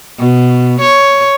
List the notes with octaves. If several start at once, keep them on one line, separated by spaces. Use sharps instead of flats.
B2
C#5